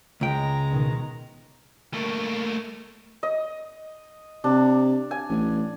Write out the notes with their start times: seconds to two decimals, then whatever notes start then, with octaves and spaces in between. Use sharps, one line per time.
0.21 C#2 G#3 G5 A#5
0.70 B2 D#3
1.94 A3 A#3
3.23 D#5
4.44 C3 D4
5.11 G#5
5.29 A1